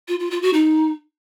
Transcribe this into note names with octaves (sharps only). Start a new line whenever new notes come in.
F4
F4
F4
F#4
D#4